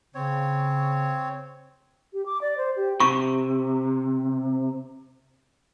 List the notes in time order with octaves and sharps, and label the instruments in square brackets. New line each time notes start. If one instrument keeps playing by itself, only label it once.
[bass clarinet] C#3 [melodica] C4 C#5
[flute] G4
D6
D5
C5
G4
[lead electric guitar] C3 [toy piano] C#6